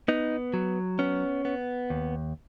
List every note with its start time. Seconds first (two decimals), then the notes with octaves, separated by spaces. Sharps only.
0.08 B3 D#4
0.54 F#3
0.99 B3 C#4
1.45 B3
1.90 D#2